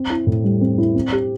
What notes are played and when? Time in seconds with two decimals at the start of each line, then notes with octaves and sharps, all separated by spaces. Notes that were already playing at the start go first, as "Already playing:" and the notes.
Already playing: C4
0.10 E4
0.27 A2
0.44 G3
0.61 C4
0.78 E4
0.95 C4
1.12 G4